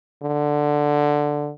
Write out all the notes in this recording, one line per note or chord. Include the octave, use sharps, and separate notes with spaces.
D3